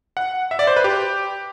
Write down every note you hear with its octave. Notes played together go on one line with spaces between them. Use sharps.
F#5
E5
D5
C5
B4
G4